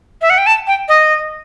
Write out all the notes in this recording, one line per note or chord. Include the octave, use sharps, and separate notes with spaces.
E5
F#5
G5
A5
G5
D#5